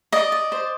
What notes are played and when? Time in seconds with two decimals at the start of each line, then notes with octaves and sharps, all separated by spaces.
0.12 D5 D#5
0.32 D5
0.52 C5